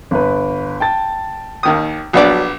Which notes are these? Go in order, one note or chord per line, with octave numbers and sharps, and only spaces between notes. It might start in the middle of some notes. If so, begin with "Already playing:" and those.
G1 B4
G5 A5 A6
D#2 D#3 D#6
A#1 F#3 B3 D4 D5